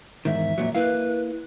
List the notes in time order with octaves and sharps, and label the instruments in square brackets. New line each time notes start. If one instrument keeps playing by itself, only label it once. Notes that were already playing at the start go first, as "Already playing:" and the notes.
[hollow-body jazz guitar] E2 G#2 D#3 [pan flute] E5
[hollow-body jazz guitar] F2 A#2 F#3
[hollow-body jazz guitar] A#3 E4 F5 [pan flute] B4